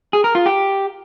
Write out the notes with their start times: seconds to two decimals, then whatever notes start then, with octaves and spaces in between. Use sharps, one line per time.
0.13 G#4
0.24 A#4
0.35 F4
0.46 G4